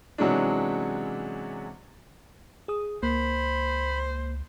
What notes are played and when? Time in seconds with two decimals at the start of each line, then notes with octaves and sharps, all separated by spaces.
0.18 C3 E3 F#3 G#3 C#4 D4
2.68 G#4 D#6
3.03 C#2 A#3 C5 B5